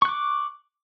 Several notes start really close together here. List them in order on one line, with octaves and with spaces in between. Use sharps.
C#6 F#6 D6